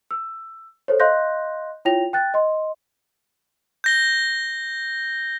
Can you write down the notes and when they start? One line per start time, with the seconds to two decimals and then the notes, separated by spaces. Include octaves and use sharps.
0.11 E6
0.88 A4 C5 C#5
1.00 D#5 F5 C6 F#6 G6 A#6
1.85 E4 F4 C#5 G5 A#6 F7
2.13 G5 F#6 A6
2.34 D#5 C6
3.84 G6 A#6 G7